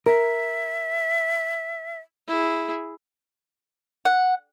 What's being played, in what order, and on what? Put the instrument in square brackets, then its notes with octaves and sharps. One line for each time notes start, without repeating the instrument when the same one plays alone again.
[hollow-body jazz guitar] A#4 [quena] E5
[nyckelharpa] E4 G#4
[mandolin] F#5